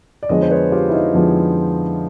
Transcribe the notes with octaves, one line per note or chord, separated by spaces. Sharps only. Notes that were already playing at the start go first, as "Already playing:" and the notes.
D5
F2 D3 F3 G#3 B3 C#5 D#5
C5
B4 C#5
F4 G4
E4
D#4 F4
F2 D3 F3 G#3 B3